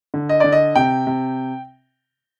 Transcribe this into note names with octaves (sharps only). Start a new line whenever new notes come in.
D3
D#5
D3 D5
D#5
C3 G5
C3